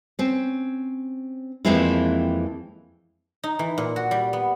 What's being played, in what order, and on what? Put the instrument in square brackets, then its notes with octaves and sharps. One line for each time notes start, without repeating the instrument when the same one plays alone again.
[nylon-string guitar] C4 C#4
F2 E3 G#3 A#3 C4 E4
[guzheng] D#4
E3
A#2
F#4
G3
B3